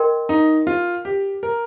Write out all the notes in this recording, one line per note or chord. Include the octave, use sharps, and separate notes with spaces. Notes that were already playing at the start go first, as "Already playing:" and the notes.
Already playing: A#4 D#5 G5 C6
D#4
F4
G4
A#4